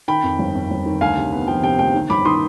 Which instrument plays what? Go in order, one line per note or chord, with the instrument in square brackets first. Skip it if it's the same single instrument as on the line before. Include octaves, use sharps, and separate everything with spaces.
[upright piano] D#3 G5 B5
F2
G1
F2
G1
D#3
D2 F5 G#5
C3
B3
F3 G5
C3 G5
D2 G5
D#3
G1 B5 D6
D#3 C6 D#6